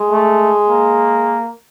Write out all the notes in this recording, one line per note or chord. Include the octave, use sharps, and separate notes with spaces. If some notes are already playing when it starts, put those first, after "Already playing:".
Already playing: G#3
A3
A#3